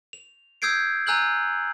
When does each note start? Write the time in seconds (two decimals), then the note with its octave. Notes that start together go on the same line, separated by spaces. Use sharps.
0.13 F7
0.62 D#6 E6 G6 G#6 C7 D7
1.07 G#5 A#5 E6 F#6 G6 F#7